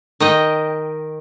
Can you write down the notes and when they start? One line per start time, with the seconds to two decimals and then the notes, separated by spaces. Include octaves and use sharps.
0.20 D#3 D#5 G5